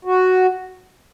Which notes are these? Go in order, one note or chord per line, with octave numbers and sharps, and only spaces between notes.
F#4